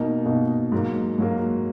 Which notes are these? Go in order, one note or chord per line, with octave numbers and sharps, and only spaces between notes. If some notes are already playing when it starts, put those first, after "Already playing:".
Already playing: B2 A#3 D#4
B2 A#3 D#4
G#2 F#3 A#3
G#2 F#3 A#3